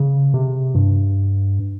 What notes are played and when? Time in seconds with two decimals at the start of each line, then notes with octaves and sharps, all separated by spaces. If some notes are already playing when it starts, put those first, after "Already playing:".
Already playing: C#3
0.34 C3
0.75 G2